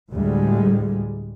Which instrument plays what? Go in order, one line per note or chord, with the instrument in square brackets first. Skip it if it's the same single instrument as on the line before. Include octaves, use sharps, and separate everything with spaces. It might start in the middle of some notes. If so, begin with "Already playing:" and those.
[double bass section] D2 A2 G3 G#3